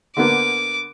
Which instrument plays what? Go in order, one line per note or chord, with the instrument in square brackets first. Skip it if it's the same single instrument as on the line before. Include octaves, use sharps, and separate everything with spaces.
[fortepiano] D3 A#3 B3 [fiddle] D6